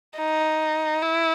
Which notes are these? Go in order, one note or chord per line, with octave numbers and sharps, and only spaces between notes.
D#4
E4